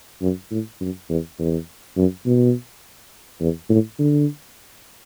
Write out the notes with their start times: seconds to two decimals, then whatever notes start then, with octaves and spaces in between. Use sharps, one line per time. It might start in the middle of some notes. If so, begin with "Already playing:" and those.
0.22 F#2
0.51 A2
0.81 F#2
1.09 E2
1.39 E2
1.97 F#2
2.26 B2
3.41 E2
3.70 A2
3.99 D3